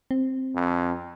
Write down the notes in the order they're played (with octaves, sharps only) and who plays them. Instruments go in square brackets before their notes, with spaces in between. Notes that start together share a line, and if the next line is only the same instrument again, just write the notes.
[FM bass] C4
[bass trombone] F2